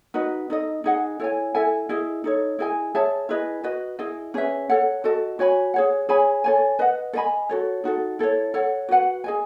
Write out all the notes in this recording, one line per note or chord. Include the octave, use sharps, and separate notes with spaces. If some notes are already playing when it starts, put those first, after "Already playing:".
D#4 F#4 B4 D#5
D#4 A4 D#5
D#4 G#4 D#5 F#5
E4 A4 C#5 G#5
E4 A4 E5 G#5
E4 G#4 D#5
D#4 A4 C#5
E4 G#4 D#5 G#5
G#4 C#5 E5 A5
E4 G#4 B4 D#5
F#4 B4 D#5
E4 G#4 D#5
C#4 G#4 B4 E5
A4 C#5 F#5
F#4 A4 D#5 A5
F#4 C#5 G#5 B5
G#4 C#5 F#5
G#4 C#5 G#5 B5
A4 C#5 G#5
B4 D#5 F#5
A4 D#5 G#5 B5
F#4 A4 C#5
D#4 F#4 A4
E4 A4 C#5
A4 C#5 F#5
F#4 B4 F#5
G#4 D#5 G#5